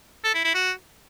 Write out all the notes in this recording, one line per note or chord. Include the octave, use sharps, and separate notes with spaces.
A4
E4
E4
F#4